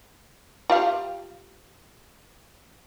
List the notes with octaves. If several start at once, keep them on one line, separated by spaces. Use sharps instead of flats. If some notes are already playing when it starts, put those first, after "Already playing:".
F4 G4 F5